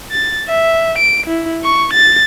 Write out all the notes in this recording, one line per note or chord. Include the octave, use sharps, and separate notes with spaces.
A6
E5
D7
E4
C#6
A6